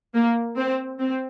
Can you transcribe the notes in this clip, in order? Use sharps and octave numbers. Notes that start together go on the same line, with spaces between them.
A#3
C4
C4